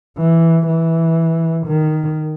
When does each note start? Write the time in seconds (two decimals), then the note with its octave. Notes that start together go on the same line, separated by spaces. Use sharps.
0.18 E3
0.67 E3
1.66 D#3